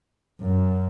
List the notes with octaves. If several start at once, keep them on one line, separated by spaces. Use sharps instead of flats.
F#2